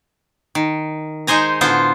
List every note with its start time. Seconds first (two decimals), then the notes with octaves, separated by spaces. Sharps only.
0.55 D#3
1.27 G#3 D#4 C5 G#5 A#5
1.61 A2 D3 B3 F4 C5